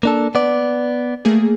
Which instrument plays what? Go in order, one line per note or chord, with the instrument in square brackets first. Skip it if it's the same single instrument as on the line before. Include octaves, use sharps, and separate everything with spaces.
[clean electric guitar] A#3 D4 A4
B3 D5
[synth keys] A3 A#3 G#4